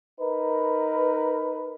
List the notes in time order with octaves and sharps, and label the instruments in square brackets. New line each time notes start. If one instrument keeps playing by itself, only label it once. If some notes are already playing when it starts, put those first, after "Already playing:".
[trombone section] D#4 A#4 B4